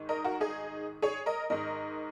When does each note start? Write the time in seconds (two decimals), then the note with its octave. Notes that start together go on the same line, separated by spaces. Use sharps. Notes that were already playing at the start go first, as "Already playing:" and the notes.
Already playing: G#2 D#3
0.09 A#4 D#5
0.24 F#4 A#4
0.41 D#4 G#4
1.02 G#4 C#5
1.26 A#4 D#5
1.50 G#2 D#3 A#4 D#5